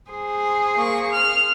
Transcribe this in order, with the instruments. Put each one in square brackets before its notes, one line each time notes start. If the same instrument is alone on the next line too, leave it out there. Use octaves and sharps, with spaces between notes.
[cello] G#4 C5
[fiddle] A#3 C#6
F6